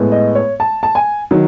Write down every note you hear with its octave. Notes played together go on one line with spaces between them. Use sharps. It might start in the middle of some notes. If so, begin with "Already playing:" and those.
Already playing: A2 G#3 B3
D#5
C#5
A5
A5
G#5
D#3 F#3